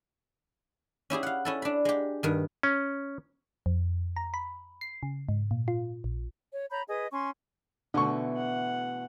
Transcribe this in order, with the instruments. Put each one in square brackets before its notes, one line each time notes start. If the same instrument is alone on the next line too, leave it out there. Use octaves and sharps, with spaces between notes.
[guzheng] C#4 E4 G4 G#4
F5 F#5
C#4 E4 A4
D4 B5
G#3 G4
G2 D#3
[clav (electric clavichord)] C#4
[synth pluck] F2
A#5
B5
C7
C#3
G#2
A#2
F4
A#1
[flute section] C#5
C#5 A#5 B5 G6
G#4 B4 D#5 D#6
C#4 G#5 C6 C#6
[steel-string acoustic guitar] B2 E3 A3 [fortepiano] D3 C#6
[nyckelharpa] F#5